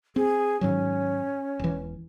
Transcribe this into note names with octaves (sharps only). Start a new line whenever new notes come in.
C4 G#4
G#2 D#3 F#3 C#4
E1 E3